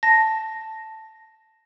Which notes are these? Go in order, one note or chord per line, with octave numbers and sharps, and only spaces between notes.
A5 A#6